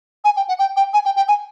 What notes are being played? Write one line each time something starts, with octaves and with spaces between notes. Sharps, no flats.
G#5
G5
F#5
G5
G5
G#5
G5
G5
G#5